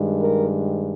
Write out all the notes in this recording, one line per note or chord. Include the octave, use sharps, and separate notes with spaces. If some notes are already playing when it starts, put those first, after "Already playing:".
Already playing: G2 D#3 G#3
A#4